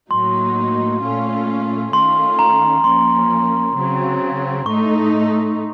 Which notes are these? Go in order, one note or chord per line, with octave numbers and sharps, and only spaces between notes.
A2 F#3 A#3 D#4 C6
A#2 A3 C#4 F4
D#3 A3 C#4 F4 C6
A#5
F3 A#3 C#4 C6
C#3 F#3 C4
A2 A3 D#4 C#6